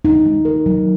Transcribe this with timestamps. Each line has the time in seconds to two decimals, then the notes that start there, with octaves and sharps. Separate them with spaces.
0.05 D#4
0.26 G#3
0.45 A#4
0.66 F#3